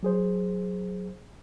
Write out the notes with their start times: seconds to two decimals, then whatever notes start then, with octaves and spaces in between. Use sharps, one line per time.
0.03 F#3 G#4 C5